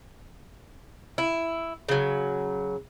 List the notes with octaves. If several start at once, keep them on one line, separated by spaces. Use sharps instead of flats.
E4
C#3 F#3